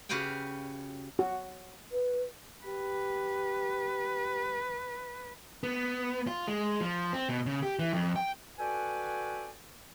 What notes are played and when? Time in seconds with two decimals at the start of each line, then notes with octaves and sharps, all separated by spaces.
0.09 C#3 F#4 G4 B4 F5 G5
1.19 F#4
1.92 B4
2.66 G4 B4
5.63 B3
6.27 F4
6.47 G#3
6.81 F3
7.13 C4
7.29 B2
7.46 C#3
7.63 G4
7.79 E3
7.93 F2
8.16 G5
8.58 F#4 A4 B4 D5 G5 G#5